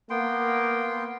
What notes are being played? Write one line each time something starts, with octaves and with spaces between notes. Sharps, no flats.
A#3 B3 G5 C6